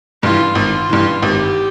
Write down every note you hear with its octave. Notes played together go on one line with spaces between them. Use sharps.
G2 E3 F4
G#1 F4
G2 E3
G#1 G4